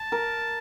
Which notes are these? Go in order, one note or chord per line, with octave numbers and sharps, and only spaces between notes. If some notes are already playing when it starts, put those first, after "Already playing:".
Already playing: A5
A#4